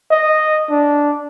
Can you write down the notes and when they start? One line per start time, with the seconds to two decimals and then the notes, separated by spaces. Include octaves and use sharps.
0.11 D#5
0.70 D4